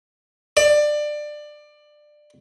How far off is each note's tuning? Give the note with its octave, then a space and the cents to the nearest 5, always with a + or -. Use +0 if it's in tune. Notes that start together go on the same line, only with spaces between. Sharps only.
D5 +20